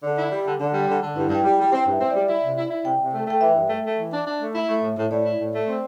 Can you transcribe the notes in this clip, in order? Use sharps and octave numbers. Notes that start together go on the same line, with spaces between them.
D3
E4
G3
D3
D3
G3
D3
D3
G2 E4
G2
G5
G3
G5
G3
C4 G5
G2 E5
C4
G3 D5
E4 E5
C3
E4
E4
C3 G5
C3
A3
A3 G5
E3 E5
G2
A3
A3
E3
D4
D4
A3
E4 E5
A3
A2
A2
A2 D5
E4
A2
A3
C4